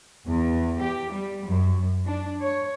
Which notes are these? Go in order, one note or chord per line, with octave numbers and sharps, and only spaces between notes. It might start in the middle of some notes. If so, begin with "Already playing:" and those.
E2
G4
G3
F#2
D4
C#5